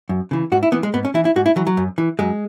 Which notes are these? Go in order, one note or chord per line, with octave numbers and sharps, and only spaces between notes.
F#2
C#3 E3
G#2 F#4
E4
E3 B3
G#3
G#2 B3
C#4
E3 E4
E4
G#2 F#4
E4
E3 F#3
F#3
F#2
E3
F#2 G#3